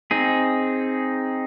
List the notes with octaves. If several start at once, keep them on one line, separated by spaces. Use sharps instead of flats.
C4 D#4 G#4